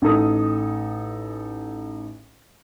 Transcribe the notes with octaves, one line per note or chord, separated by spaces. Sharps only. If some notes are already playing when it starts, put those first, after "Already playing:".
A1 D#4 A4 D#6